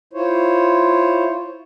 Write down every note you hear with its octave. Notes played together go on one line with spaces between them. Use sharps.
E4 F4 C5 C#5